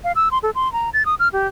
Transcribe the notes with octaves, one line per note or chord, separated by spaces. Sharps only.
F5
E6
C6
A4
C6
A#5
A6
D#6
F6
G4